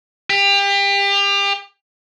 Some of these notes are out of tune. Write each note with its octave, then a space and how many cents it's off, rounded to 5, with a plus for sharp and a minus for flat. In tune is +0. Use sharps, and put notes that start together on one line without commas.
G4 +30